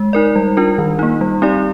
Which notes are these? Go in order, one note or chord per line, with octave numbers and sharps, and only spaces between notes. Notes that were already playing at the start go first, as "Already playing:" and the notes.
Already playing: G#3
D#4 A#4 D5
G3
D4 F4 A#4
D#3
A#3 D#4
G3
C4 D#4 G4 D5